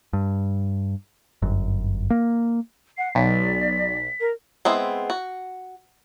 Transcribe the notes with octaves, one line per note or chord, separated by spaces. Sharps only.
G2
G1 F#2
A#3
F#5 C7
B1 D5 B6
A#4
G#3 B3 C4 E4
F#4